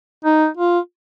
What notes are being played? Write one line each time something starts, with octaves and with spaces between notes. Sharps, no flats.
D#4
F4